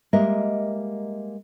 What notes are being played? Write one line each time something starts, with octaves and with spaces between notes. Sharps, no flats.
G3 G#3 A#3 A#4 D#5 E5